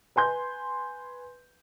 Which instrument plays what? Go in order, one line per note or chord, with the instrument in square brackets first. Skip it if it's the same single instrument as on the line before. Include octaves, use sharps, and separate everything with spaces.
[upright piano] B4 G#5 C6 G6